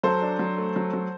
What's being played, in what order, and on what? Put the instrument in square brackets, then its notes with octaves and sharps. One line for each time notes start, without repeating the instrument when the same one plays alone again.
[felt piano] F#3 [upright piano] A4 C5
[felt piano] D4
F#3
A3
F#3
F#3